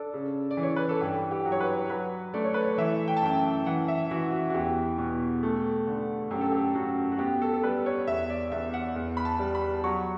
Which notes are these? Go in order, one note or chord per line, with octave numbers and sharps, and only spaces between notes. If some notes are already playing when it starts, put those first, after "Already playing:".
Already playing: D4 A4
C#3
D5
E3
C#5
B4
A4
G2 G4
G4
F#3
C#5
B4
F#3 B4
A3 D5
C#5
B4
C#5
E3 E5
G5
A5
F#2 G5
A5
E3 F#5
E5
E3 F#4
F#4
F#4
E2 G4
B2
A3
D3
F#2 G4
A4
G4
F#2 F#4
F#4
B3 G4
A4
A4
G3 B4
C#5
E2 E5
D5
E2 E5
F#5
E2
B5
A5
G3
B5
F#3 C#6